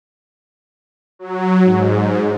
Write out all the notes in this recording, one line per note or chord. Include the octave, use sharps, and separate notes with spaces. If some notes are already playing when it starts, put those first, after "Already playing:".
F#3
G#2